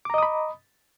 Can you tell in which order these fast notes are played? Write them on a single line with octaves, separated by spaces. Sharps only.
D6 A#5 D#5 D#6 B5